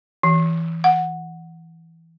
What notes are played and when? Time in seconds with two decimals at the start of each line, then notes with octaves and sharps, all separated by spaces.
0.23 E3
0.84 F#5